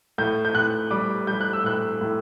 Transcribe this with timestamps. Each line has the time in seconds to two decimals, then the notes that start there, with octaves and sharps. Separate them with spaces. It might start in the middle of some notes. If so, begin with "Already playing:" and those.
0.18 A2 G6
0.45 G6
0.54 A2 F#6
0.91 G3 D6
1.27 G3 G6
1.41 F#6
1.53 E6
1.64 A2 F#6
2.01 A2